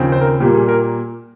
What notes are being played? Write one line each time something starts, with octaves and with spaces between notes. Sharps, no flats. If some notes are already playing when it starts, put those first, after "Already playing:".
Already playing: D#2 C#3 F3 C4
C5
A#4
A#2 G3 A#3 G4
G#4
A#4